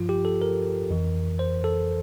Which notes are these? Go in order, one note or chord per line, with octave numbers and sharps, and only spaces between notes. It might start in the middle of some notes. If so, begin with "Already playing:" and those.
Already playing: G2 F3 F4
G4
A4
A#4
F2 E3
C5
A4